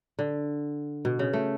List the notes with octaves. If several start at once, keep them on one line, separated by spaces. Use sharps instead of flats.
D3
B2
C#3
A3